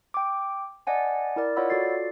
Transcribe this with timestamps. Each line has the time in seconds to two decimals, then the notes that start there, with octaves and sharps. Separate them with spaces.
0.14 G5 D6
0.87 D5 D#5 F#5 G#5 A5
1.36 E4 A#4 D5
1.56 F4 C#5 D#5 F#5 B5 E6
1.70 F4 F#4 A4 D5 A6 C7